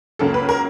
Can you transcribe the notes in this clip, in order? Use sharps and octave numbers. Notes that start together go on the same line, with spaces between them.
C#2 C#3 F#3 A#3 A4
B4
A#4